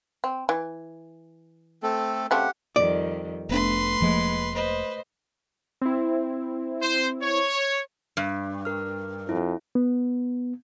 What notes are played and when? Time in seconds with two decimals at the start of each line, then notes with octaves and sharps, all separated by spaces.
0.24 C4
0.49 E3
1.83 A3 C4 A4
2.31 C#3 A3 C4 G4 F#5
2.76 F2 D#3 G3 D5
3.49 F1 A3 B3 D4 B4 C6
4.00 F1 F3 G#3 A#3
4.54 B4 C5 D#5
5.82 C4 E4
6.82 C5
7.22 C#5
8.17 G2
8.65 A#4 F6
9.29 F2 E4
9.75 B3